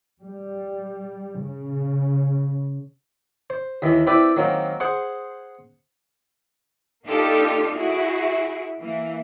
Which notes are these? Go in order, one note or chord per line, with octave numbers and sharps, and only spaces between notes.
G3
C#3
C5
D#2 D#3 E3
C4 E4 G4 B4 D5
D#3 F#3 A#3 C4
G#4 C5 F#5 C6
A#3 D4 D#4 F4 G4 A4
E4 F#4 G#4
E3 A#3